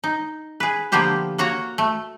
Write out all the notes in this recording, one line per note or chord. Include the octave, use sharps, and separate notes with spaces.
D#4
G#4 B4
D3 F3 A#3 B3 G4 C5
A#3 F#4 C#5 A#5
A3